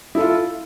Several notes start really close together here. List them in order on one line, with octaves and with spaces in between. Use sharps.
E4 A4 F4